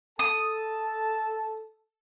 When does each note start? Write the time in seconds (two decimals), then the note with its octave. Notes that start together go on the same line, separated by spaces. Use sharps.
0.19 A4 A5 D#6